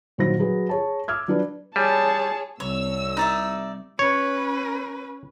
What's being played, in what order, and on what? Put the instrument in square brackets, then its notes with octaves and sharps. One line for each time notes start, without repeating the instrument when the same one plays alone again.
[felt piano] A#2 D#3 F#3 C5 A#6
F#3 G#4 B4
G#4 C#5 A5
D6 E6 F6 G#6
F#3 D4 B4 D5
[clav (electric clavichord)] G3 [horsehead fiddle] G#4 C#5 [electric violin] A5
[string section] C2 E6 [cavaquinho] C#5
[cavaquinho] D#4 D5 E5
[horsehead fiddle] C#4 B4 [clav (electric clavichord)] C#5